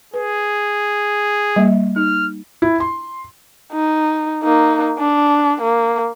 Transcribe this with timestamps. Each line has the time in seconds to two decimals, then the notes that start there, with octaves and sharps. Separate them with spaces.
0.14 G#4 B4
1.56 G3 A#3 E5
1.96 D#4 F6
2.62 E4
2.80 C6
3.73 D#4
4.43 A#3 D#4
4.99 D4
5.62 A#3